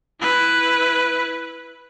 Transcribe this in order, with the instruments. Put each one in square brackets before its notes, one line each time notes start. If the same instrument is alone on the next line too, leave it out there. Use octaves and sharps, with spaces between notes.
[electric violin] E4 B4